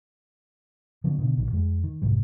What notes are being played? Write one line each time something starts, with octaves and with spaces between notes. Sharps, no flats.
D3 F3 B3 C#4
B2 D3
A#1 D#3
F2 G#3
D#3
F1 C2 G#2 G3